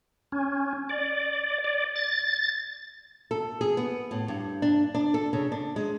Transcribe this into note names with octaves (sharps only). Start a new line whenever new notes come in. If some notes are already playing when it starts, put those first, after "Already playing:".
C#4
D5
D5
A6
A4
G#4
B3
A2
G2
D4
D4
A4
C#3
D4
G#3